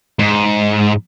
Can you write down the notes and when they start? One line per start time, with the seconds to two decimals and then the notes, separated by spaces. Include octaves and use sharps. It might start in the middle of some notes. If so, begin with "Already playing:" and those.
0.19 G#2